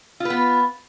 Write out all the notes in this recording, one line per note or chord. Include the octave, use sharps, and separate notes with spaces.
B3 F4 B4